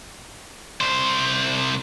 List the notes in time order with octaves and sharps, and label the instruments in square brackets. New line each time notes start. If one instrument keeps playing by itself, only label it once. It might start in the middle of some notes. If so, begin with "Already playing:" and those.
[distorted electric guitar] C2 C5